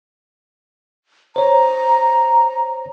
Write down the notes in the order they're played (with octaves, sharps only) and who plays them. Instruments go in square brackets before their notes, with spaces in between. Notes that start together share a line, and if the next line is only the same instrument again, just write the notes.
[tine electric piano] C5 C#5 [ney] A#5